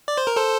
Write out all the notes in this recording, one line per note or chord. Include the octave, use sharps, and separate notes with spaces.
D5
C5
A#4
A4 C5